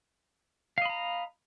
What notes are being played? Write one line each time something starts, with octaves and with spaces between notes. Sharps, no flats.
D#5 F5 A#5 B5